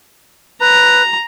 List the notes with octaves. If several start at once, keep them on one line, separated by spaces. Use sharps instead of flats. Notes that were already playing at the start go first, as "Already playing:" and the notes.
B4 A#5